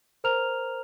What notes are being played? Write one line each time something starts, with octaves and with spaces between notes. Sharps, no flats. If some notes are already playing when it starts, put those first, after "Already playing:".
A#4 C5 A#5 F6 F7